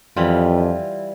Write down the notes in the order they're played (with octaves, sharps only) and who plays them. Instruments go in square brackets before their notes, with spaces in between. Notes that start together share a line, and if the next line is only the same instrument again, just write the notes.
[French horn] F2 [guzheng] E3 G3 F4